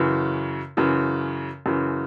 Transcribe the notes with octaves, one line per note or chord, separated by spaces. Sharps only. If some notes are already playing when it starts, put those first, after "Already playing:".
Already playing: F#2 C#3 E3
F#2 C#3 E3
F#2 C#3 E3